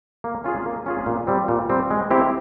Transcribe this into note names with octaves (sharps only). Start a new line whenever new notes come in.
A#3
C#4 F4 G#4
A#3
C#4 F4 G#4
A#2
G3 C4
A#2
G3 C4
G#3
C4 E4 G4